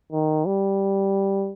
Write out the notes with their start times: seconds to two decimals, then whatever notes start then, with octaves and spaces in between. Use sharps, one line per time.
0.12 D#3
0.46 G3